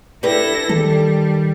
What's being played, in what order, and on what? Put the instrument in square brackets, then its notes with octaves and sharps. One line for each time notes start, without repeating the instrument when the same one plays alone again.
[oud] D4 G4 B4 [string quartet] E4 A4 A#6
[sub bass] D#3 [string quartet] G3 [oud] A4